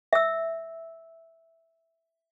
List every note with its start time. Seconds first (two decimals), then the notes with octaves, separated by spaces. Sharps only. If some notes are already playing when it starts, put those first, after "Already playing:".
0.13 E5 E6